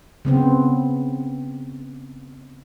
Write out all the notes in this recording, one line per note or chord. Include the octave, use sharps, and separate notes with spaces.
C#3 B3 C4